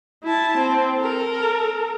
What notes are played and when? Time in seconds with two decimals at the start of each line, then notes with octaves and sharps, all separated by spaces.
0.24 E4 A5
0.58 C4
0.98 A4 A#4